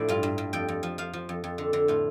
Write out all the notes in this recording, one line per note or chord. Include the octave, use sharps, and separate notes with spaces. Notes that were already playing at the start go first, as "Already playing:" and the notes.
Already playing: A2 F3 D4
G2 F4
G2
G2
F2 G5
F2
F3
F3 F5
F3
F2
F2
D3
D3
A2 F4